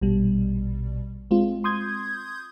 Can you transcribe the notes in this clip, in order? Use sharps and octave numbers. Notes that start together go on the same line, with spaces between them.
A#1 B2 G3
G#3 C4 F4
C6 D#6 G6 G#6